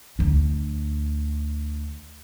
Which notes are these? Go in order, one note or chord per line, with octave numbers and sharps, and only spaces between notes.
D2 D4